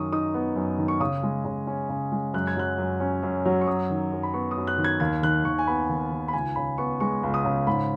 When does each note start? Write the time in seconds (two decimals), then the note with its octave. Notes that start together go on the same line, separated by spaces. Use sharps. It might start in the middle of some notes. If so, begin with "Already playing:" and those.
Already playing: F#2 D#3 C#6 D#6
0.12 D#4 D#6
0.34 B3
0.56 F#2
0.78 D#3
0.88 C#6
1.00 C#3 D#6
1.23 G#3
1.45 C#3
1.67 C#4
1.89 C#3
2.12 G#3
2.33 F#2 F#6
2.47 G#6
2.57 F#3 F#6
2.78 F#2
3.00 C#4
3.23 F#2
3.46 F#3
3.61 C#6
3.67 F#2 D#6
3.90 D#3
4.12 F#2
4.23 B5
4.33 B3 C#6
4.51 D#6
4.57 F#2
4.67 F#6
4.78 D#3
4.84 G#6
5.00 D#2 G#6
5.23 D#3 F#6
5.44 D#2 C#6
5.59 G#5
5.67 B3 B5
5.89 D#2
6.11 D#3
6.28 B5
6.33 C#2 G#5
6.56 C#3 B5
6.78 B3 C#6
7.00 G#3 C#6
7.23 C#2
7.34 D#6
7.45 C#3
7.67 G#2 B5